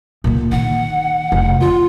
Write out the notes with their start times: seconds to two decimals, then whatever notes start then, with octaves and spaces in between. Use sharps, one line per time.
0.24 A#2 D3
0.52 D#3 F#5
1.32 F1
1.60 D3 F4